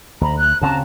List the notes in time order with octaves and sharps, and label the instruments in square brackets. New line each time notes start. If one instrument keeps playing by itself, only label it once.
[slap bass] D2 [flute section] A#5 B5
[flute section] F#6
[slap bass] D2 C#3 C4 [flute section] A5 A#5